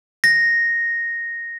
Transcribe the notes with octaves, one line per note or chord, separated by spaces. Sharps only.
A#6